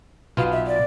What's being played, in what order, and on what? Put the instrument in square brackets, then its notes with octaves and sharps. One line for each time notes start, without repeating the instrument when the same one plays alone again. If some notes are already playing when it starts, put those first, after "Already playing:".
[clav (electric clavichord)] B1 B2 B3 F4 [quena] F5
[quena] E5
D5